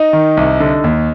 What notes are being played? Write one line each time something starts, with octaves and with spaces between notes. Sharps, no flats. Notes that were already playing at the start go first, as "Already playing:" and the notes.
Already playing: D#4
D#3
C2
D3
D#2